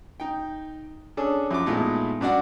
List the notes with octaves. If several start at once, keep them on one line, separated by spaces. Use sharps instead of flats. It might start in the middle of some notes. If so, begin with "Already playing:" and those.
D#4 G5
C#4 D4 G#4 A4
F#2 F3 D6
A#2 G#3 A3 B3 D#4 E4
G2 D4 F#4 D5 F#5